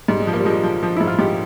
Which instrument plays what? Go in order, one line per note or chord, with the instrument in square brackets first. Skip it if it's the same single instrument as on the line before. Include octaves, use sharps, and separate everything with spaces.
[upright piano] G#2 G3
G#3
F3
A#3
G3
F3 G#3
F3
F3
G#2 E4
F4
G#2 G4